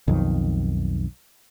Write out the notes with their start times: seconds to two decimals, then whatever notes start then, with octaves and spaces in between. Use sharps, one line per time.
0.08 B1 F2 D#3